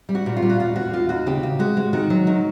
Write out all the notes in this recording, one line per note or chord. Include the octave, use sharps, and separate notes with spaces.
G3
F#4
A#2
F4
G3
F#4
D#2 F4
D#2 F#4
D#2 F4
D#2 F#4
C#3 G4
C#3
G#3 F#4
G#3
D#3 F#4
F#3
D#3